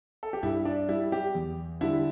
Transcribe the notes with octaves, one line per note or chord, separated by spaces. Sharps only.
A4
G4
G2 E4
D4
G3 E4
G4
E2
D3 G3 E4